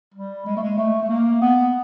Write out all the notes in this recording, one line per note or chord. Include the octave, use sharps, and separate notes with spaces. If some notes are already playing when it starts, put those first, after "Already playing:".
G3
G#3
A3
G#3
A3
A3
A#3
B3